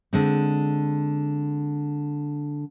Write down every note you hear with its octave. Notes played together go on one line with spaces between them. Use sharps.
D3 G#3 C4